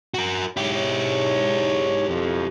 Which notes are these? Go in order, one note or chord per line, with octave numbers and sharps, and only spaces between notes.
F#4 A#4
G#2 E4 G4 C#5
F2